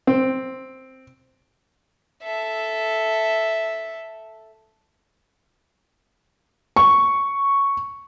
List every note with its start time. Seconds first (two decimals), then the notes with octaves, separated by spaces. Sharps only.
0.07 C4
2.23 A4 E5
6.76 C#6